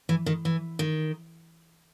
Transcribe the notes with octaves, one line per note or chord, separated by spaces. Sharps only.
E3
D#3
E3
D#3